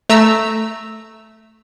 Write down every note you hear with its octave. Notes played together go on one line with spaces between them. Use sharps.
A3 A#5 E6